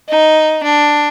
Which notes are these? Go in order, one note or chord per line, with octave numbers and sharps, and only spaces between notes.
D#4
D4